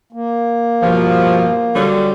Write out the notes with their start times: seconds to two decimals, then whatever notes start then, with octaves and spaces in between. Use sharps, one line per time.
0.13 A#3
0.82 G2 B2 F3
1.75 D3 F#3 G3